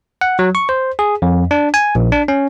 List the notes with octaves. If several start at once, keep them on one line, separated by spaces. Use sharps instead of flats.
F#5
F#3
C#6
C5
G#4
F2
D4
G#5
A#1
D4
C#4